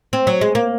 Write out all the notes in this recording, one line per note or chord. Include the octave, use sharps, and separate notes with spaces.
C4
F#3
G#3
A#3